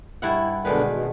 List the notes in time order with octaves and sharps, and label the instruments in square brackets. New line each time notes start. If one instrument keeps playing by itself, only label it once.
[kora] G2 E4 F#5
[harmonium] B2 D3 D4 [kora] D#3 G#3 B4
[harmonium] B2